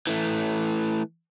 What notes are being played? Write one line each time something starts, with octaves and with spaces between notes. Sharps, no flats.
E3 A3